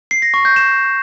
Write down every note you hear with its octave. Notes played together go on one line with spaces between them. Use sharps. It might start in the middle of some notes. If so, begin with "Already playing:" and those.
C7
A#6
C#6
G6
E7